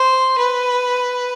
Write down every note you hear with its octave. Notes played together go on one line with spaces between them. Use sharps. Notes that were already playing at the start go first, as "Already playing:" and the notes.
Already playing: C5
B4